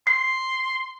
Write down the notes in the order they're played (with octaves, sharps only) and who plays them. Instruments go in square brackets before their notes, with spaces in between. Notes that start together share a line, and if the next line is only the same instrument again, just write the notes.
[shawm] C6 [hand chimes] C7